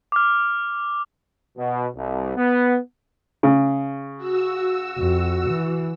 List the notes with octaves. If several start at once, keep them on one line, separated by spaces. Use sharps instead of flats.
D6 F6
B2
C2
B3
C#3
F#4 E6
F2
E3